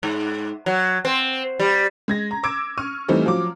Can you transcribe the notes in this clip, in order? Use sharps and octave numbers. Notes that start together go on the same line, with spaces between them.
G#2
F#3
C4
G3
G#3 G#6 A#6
A#5
D6 E6 G#6 D7
C#6 F6 D#7
E3 G3 A3 C4 D#4
F3 F#3 D6